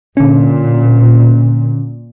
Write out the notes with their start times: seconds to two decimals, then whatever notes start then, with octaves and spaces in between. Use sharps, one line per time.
0.17 A#2 D3 C#4